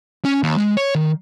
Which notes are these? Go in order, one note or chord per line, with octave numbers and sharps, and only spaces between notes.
C#4
D#2
G#3
C#5
D#3